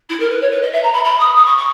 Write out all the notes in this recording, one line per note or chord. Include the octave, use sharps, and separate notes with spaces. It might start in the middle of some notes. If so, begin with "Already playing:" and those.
E4
A#4
B4
C#5
B4
D#5
E5
A#5
B5
B5
D#6
D#6
C#6
C#6